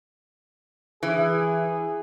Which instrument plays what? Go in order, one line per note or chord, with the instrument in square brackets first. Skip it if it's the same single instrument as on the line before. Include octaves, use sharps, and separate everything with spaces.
[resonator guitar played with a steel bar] E3 [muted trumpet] G#4